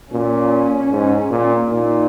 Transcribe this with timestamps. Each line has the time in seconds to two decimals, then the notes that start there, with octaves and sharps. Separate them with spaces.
0.12 A#2 C#4
0.92 G#2
1.30 A#2
1.70 A#2 D#4